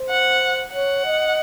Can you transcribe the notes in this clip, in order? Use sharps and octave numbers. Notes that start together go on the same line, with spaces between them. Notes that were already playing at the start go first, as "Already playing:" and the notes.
Already playing: C5
F#5
C#5 F#5
D#5